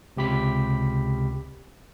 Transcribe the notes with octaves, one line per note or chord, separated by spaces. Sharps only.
C#2 C3 G4 B5 B6